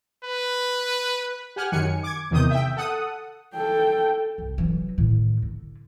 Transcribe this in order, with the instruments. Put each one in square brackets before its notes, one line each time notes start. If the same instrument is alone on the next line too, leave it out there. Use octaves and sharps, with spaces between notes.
[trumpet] B4
[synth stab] G4 F#5 G#5 F6 F#6
F#2 D#3 G#5 C#7
D6 G#6
E2 C3 D#3 D#6 G6
E5 G5
A4 F#5 D#6
[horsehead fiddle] A4 G5
[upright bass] C2
E3 F#3
A2 D#3
D3